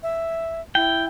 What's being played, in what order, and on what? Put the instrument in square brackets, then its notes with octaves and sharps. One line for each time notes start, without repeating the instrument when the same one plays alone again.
[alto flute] E5
[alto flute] E4 [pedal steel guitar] G5